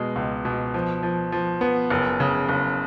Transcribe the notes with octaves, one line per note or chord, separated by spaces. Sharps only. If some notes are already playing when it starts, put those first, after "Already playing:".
Already playing: B2 G#3
C#2
B2
F3
F3
F3
B3
F#1
C#3
F#1